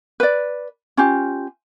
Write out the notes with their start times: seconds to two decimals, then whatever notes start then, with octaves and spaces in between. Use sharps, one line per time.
0.20 B4 D5
0.97 C#4 F4 G4